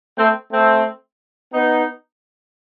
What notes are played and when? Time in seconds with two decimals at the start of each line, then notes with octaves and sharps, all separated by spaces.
0.18 A3 C4
0.52 A3 C4
1.54 B3 D#4